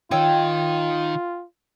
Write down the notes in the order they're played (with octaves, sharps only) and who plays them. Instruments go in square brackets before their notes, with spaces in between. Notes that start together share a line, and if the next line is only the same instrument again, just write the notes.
[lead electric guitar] D#3 D#4 [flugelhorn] F4 [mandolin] C#5 G5 E6